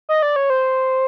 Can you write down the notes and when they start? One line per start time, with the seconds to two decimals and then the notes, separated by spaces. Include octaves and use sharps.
0.09 D#5
0.23 D5
0.36 C#5
0.50 C5